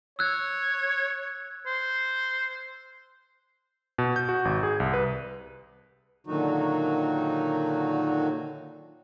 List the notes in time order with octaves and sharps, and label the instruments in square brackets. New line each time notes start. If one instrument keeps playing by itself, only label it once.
[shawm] C#5 [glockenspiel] E6 F#6 G#6
[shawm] C5
[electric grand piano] B2
G6
F#4
G#1
G#4
C2
B4
[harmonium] A#2 D3 D#3 F#3 D#4 F#4